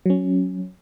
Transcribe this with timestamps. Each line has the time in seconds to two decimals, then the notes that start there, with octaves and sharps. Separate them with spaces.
0.06 F#3 C#4